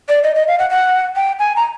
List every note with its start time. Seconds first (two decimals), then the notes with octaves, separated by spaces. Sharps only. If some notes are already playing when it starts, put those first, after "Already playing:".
0.09 D5
0.24 D#5
0.35 D#5
0.48 F5
0.59 F#5
0.70 F#5
1.16 G5
1.39 G#5
1.56 A#5